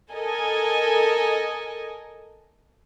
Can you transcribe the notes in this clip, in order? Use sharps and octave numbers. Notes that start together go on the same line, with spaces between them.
A4 A#4 D#5 G#5